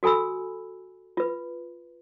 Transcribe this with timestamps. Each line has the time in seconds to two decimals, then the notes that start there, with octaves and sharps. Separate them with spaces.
0.03 F#4 A4 G#5 B5 E6
1.17 F4 B4